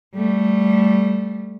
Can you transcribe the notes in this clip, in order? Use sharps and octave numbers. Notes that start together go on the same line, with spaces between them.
G3 A3